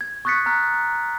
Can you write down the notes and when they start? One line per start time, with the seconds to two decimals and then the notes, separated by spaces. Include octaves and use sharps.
0.01 G#6
0.25 C#6 D#6 F#6 A6 B6 C#7
0.46 A#5 F6 F#6 B6